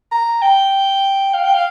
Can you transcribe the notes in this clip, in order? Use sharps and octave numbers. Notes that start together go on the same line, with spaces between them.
A#5
G5
F5
G5
F5